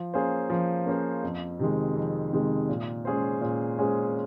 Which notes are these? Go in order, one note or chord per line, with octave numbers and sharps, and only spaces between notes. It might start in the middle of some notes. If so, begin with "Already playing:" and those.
Already playing: F3
A#3 C#4 G#4 C5
F3
A#3 C#4 G#4 C5
F2
C3 D#3 G#3
F2
C3 D#3 G#3
A#2
G#3 C#4 G#4 C5
A#2
G#3 C#4 G#4 C5